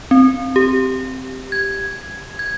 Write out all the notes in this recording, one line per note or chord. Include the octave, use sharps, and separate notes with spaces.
C4
G4
G#6
G#6